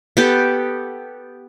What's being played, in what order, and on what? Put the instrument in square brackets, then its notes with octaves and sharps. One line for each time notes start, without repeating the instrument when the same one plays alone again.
[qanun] B3 G4 A4